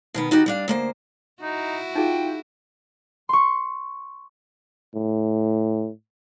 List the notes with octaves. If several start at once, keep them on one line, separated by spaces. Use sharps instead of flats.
B2 D#3 B3
D#3 D#4 F#4 G4
G3 D4 F5
D2 A#3 C5
D#4 E4 F#4
D#4 F4 G#4 G5
C6 C#6
A2